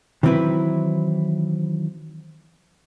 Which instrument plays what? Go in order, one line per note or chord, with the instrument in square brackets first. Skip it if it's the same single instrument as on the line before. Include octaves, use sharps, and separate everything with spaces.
[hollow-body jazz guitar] D#3 E3 F#3 C4 E4 B4